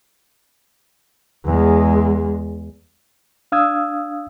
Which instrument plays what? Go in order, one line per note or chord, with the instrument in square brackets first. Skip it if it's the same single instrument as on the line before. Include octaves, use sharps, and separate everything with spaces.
[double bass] E2 G#3
[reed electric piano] D4 F5 D#6 E6 G#6